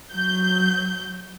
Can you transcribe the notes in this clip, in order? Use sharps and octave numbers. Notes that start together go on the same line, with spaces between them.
F#3 G6